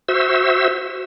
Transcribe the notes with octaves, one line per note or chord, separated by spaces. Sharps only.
F#4 C5 E5 E6